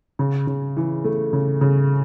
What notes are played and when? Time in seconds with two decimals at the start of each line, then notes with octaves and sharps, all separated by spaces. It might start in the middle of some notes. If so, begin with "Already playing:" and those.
0.19 C#3
0.47 C#3
0.77 E3
1.04 A3
1.33 C#3
1.61 C#3